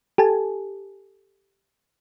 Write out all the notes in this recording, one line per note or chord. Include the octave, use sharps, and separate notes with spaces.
G4 A4 G#5 A5